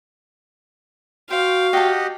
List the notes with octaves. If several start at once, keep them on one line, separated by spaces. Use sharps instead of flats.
F#4 C5 F5 G5
G4 D#5 F#5 G5 A5